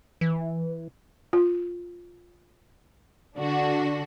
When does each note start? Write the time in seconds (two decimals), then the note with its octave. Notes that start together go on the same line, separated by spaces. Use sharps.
0.21 E3
1.33 F4
3.36 D3 D4 F#4